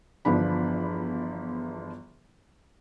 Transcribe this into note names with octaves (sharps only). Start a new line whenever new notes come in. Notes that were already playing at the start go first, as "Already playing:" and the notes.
G1 E2 F3 D4 B5